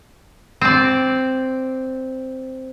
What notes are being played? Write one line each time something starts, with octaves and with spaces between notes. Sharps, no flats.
C4 D5